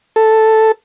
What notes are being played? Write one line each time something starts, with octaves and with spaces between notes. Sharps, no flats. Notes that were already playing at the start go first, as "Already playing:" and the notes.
A4